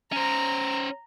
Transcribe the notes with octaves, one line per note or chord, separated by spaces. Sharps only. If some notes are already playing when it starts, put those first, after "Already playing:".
C#4 C5 A#5